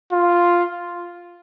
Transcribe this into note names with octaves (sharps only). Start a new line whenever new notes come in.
F4